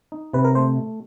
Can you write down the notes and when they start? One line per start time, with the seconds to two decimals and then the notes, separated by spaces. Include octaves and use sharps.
0.12 D#4
0.33 C3 B4
0.45 A#4
0.55 A3 C5